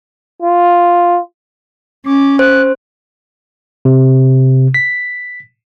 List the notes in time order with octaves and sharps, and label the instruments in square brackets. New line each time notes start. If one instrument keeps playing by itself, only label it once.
[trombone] F4
[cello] C#4 [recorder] D6
[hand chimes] C5 [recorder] F#6
[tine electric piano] C3
B6